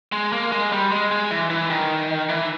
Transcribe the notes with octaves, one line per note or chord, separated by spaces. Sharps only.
G#3
A#3
G#3
G3
G#3
G#3
E3
E3
D#3
E3